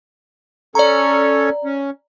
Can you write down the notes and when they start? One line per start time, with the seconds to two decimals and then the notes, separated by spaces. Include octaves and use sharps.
0.75 C#4 A4 C#5 D5 A#5
1.64 C#4